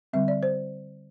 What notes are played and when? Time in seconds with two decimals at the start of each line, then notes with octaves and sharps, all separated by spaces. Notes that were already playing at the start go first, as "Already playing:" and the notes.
0.13 D3 G3 C4 E5
0.28 D5
0.43 C5